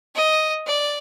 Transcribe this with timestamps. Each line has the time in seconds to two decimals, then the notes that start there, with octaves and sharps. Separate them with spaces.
0.15 D#5
0.67 D5